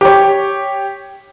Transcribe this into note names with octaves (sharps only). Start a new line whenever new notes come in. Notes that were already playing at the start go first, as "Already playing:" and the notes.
G4 C#5